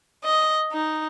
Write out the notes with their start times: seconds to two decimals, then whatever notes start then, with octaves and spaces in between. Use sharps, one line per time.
0.24 D#5
0.72 D#4